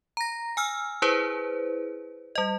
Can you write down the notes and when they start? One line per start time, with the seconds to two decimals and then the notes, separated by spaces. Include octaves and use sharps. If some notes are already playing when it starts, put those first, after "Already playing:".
0.17 A#5 A#6
0.57 G#5 E6 F6
1.02 E4 G#4 B4 C5
2.35 G3 D#5